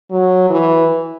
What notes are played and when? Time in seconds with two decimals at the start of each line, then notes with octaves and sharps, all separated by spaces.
0.11 F#3
0.50 E3